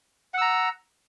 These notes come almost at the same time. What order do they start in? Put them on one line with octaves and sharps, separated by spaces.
F#5 E6 A#5